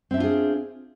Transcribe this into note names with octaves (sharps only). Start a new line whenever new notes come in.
C4 D4 F4 G#4 E5